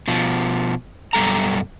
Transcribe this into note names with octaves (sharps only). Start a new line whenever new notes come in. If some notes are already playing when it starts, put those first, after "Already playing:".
B2 F3
F#2 B2 G3 A4 A#5